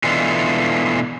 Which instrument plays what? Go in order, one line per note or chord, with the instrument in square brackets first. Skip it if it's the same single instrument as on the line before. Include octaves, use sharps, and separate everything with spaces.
[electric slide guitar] B2 E3 G#3 A3 D4 F4